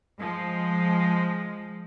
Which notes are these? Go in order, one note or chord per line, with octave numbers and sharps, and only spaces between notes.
F3 G#3